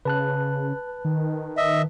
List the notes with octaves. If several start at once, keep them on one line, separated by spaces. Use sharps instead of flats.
C#3 B4 A5 F#6
D#3
D#5 E5